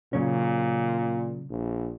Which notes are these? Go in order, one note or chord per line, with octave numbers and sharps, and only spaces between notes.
A#2 C#3 F#3 C#4
A#1